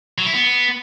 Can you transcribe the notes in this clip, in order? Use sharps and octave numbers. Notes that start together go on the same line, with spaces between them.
F#3
E4
B3